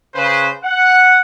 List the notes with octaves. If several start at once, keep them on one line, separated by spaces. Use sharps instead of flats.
C#3 B4 C5
F#5